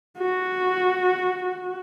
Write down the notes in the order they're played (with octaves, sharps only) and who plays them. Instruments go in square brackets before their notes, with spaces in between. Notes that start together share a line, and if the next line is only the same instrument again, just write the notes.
[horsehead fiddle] F#4